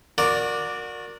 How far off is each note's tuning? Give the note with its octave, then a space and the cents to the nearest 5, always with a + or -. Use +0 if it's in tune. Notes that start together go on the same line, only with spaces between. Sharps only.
F#4 -25 A#4 +0 D5 +0